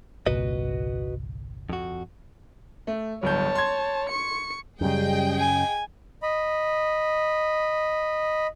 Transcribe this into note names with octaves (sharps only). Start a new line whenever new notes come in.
G1 C2 A#2 F#4 B4 D#5
F2 F#4
A3
D1 G1 C#5 A5 G6
C6 G#6
C#6 C#7
F#2 C#3 G3 G#4 D#5 G5
G#5
D#5 B5